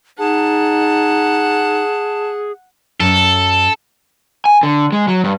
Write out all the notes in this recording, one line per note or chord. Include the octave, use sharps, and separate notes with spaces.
D#4 G#4 F#5 A5
F#2 A4
G#5
D3
G#3
F#3
G2